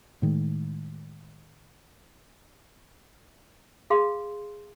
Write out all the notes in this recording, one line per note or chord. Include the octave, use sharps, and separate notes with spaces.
A2 D#3 G#3
G#4 F5 C6